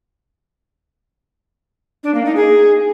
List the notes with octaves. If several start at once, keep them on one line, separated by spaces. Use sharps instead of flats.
D4
A#3
D#4
G#4